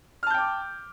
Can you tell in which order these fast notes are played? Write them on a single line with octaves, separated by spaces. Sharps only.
F6 A5 G6 G5 D6